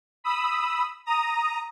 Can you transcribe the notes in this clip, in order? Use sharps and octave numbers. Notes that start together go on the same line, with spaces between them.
B5 D#6 E6
A#5 D#6